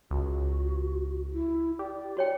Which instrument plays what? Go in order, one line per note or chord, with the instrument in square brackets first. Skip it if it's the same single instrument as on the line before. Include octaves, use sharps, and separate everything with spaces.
[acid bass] C#2 [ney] F#4
[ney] E4
[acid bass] G4 [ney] D5
[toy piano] F#4 C#5 G5